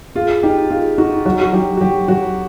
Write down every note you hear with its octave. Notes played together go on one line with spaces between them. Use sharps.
F4 G#4
D#4 G4
F4 G#4
D#4 F#4
F#3 F#4
F#4
F#3 G4
F#4
F#3 G4
F#3 F#4